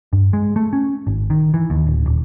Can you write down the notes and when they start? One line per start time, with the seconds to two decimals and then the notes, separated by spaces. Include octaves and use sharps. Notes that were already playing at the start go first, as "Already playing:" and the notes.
0.13 G2
0.33 G#3
0.56 A3
0.73 C#4
1.07 G#1
1.30 D#3
1.54 E3
1.70 D#2
1.87 D1
2.06 D#1